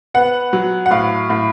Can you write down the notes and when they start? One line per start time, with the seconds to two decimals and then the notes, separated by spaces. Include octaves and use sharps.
0.14 B3 F#5
0.53 F#3
0.86 F#5
0.91 A2 F5
1.30 A2